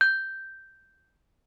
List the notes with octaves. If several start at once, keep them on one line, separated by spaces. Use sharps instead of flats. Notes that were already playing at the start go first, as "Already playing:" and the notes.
G6